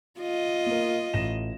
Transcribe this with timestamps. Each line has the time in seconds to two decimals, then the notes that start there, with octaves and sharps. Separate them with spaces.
0.20 F4 D#5
0.66 A#3 A#4
1.14 A1 A#6 E7